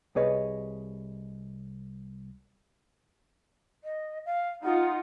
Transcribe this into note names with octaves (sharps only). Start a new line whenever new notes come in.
C2 C3 G#4 B4 C#5 D#5
D#5
F5
D#4 F4 F#5